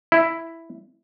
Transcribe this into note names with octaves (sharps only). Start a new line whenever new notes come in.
E4